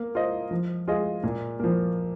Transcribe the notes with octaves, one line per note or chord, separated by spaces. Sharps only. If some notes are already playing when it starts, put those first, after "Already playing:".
Already playing: A#3
F4 C5 D#5
F3
G#3 F4 G#4 D#5
A#2
F3 A#3